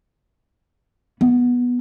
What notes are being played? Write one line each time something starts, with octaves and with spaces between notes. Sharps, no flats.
B3